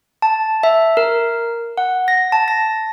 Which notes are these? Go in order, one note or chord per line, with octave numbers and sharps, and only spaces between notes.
A5
E5
A#4
F#5
A#6
A5
A#6